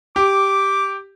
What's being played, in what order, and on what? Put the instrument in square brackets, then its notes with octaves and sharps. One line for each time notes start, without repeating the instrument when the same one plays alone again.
[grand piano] G4 [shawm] D6